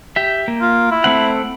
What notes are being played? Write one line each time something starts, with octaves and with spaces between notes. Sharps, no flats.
G4 E5
A#3
F4
E4
A3 C4 F#5